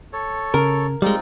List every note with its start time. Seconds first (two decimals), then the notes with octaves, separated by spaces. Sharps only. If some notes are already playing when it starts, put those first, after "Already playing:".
0.13 A4 C#5
0.54 C#3 A#4
1.02 G3 G#3 C4 D#4 F4